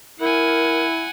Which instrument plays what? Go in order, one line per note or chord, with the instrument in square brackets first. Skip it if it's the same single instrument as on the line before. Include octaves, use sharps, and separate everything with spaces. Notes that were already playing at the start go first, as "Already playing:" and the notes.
[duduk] E4 [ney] A#4 [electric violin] F#5 G#5